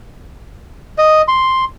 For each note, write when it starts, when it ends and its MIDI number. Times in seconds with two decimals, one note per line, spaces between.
0.98 1.22 75
1.28 1.65 84